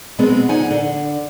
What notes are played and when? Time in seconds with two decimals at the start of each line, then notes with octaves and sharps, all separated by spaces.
0.18 B2 F#3 G#3 B3 C4
0.48 D3 F3 D#4 F#5 G#5
0.71 D3